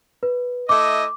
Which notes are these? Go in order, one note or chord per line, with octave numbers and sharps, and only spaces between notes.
B4
A3 E4 D#5 D6